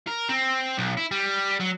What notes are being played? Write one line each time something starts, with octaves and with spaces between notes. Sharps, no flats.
A#4
C4
B1
E4
G3
F#3